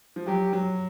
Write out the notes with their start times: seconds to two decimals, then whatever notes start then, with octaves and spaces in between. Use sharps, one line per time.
0.16 F3
0.27 F#3 G4
0.53 F#3